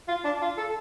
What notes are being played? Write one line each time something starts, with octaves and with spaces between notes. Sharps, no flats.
F4
D4
F4
A4